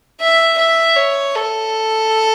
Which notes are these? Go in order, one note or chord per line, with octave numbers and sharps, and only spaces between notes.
E5
E5
C#5
A4